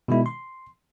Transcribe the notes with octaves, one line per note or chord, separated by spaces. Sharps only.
B2 D#3 G#3 E4
C6